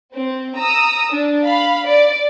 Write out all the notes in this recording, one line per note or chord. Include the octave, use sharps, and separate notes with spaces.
C4
A#5 D#6 E6
D4
F5 B5
D5